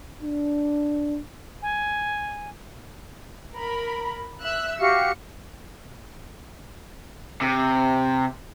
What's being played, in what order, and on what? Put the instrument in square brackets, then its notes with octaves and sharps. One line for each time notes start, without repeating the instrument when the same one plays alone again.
[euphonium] D4
[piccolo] G#5
[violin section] A#4 B5
E5 E6 F#6
[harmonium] F#4 G4 F5 [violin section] C#7
[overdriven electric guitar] C3